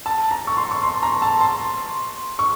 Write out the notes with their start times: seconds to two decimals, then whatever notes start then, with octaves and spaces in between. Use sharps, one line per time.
0.06 A5
0.31 A#5
0.47 C#6
0.57 C6
0.71 C#6
0.83 C6
1.03 A#5
1.22 A5
1.41 C6
2.39 C#6